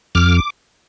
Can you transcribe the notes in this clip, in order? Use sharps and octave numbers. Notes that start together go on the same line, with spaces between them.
F2 D6 F6